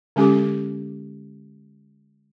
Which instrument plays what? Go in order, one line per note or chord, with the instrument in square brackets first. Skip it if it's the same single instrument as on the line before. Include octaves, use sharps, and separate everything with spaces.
[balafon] D3 G#3 C#4 G4 A4 D6